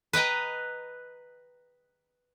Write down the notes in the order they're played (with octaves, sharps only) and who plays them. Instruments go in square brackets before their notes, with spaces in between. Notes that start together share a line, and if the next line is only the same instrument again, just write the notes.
[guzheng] B4 D#5 G5 A#5